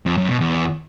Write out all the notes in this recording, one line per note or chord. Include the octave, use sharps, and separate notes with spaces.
F2
F#2
B2
E2